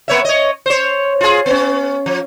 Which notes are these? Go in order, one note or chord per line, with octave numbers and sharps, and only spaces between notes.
A#3 C#5 E5
C#5 D#5
C5 C#5
F4 G#4
B3 C#4
F3